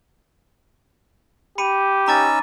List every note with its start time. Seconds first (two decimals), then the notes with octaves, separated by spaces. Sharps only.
1.58 G4 B5 C#7 D#7
2.08 C#4 D#4 A#5 D6 E6 A6